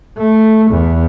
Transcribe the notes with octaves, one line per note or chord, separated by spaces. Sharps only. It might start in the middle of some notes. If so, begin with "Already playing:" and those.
A3
E2